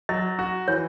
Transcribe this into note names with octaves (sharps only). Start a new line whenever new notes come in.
F#3 D#5
F#4
E3 C#5